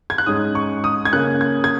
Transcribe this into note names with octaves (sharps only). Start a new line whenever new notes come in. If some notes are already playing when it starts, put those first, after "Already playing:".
G#6
F#6
G#2 G#3 C#4 D#6
C#6
D#6
G#6
C#3 A#3 C#4 F#6
G#6
G#6